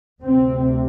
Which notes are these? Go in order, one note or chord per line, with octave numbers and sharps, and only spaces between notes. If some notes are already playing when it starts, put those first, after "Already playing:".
D2 C3 C4